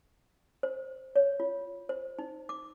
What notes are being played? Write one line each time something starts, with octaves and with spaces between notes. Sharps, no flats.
C5
C#5
F4
C5
D#4
D6